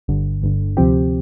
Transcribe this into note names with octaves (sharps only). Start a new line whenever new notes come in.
G1 G2 D3
G1 G2 D3
D2 C3 F3 C4 G4